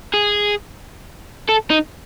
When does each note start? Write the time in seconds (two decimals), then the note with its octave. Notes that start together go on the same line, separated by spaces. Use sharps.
0.14 G#4
1.49 A4
1.70 D#4